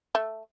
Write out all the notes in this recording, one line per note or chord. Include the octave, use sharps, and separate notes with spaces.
A3